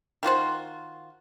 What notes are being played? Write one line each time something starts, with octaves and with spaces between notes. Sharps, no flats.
D#3 F4 F#4 C5